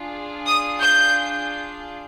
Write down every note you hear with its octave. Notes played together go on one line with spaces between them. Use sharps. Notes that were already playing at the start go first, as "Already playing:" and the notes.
Already playing: D4 F4 G#4
D#6
G6